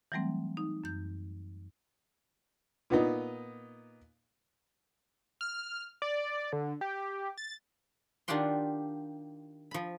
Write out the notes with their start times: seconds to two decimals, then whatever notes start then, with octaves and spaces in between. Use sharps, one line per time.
0.12 E3 F#3 G3 A3 C4
0.57 D#4
0.84 F#2 G6
2.90 A#2 B3 D#4
5.41 F6
6.02 D5
6.53 D3
6.81 G4
7.38 A6
8.28 D#3 D4 F4 G4 F#5 C6
9.71 F3 B5